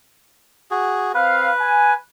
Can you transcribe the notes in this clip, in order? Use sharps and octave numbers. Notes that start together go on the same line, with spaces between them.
F#4 G#4
C4 B4 F5
G#5